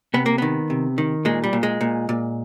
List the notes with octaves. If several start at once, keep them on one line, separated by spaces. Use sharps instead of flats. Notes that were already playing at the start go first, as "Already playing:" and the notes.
C3 B3
A#3
D#3 B3
C3
D#3
A#2 G#3
G3
A#2
G#3
A#2
A#2